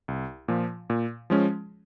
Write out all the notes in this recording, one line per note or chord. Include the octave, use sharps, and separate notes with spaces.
C2
A#2 F3
A#2
F3 G#3 C#4